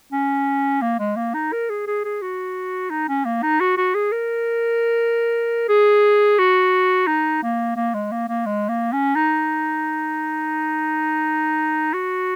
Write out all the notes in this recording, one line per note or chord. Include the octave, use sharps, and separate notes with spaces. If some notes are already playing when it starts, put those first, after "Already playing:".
C#4
A#3
G#3
A#3
D#4
A#4
G#4
G#4
G#4
F#4
D#4
C#4
A#3
D#4
F#4
F#4
G#4
A#4
G#4
F#4
D#4
A#3
A#3
G#3
A#3
A#3
G#3
A#3
C#4
D#4
F#4